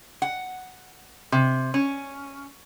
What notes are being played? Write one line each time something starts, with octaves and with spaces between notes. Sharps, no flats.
F#5
C3
C#4